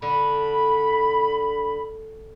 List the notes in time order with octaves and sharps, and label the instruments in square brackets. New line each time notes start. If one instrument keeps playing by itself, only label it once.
[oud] D3 [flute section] B5